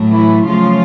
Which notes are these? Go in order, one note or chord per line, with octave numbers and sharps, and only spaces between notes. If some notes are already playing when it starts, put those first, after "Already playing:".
Already playing: A2 F#3 A3
E3 E4
C#3 F3 F#3 A3 F4